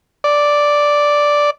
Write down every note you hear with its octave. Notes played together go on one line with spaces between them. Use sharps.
D5